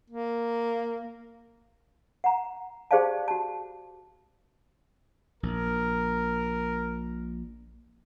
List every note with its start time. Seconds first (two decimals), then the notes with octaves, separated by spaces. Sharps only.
0.10 A#3
2.24 F#5 A#5
2.91 G4 G#4 C5 D5 F5 A5
3.28 F#4 A5
5.43 A#1 A#4